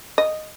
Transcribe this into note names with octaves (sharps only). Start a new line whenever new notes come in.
D#5